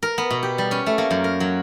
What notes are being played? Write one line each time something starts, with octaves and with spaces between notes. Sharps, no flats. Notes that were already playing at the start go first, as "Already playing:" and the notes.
A#4
B3
B2
G4
G3
C#4
A3
A#3
F#2
A#4
F#3